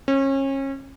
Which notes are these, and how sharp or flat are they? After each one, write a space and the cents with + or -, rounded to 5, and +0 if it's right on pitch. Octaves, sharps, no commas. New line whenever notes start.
C#4 -30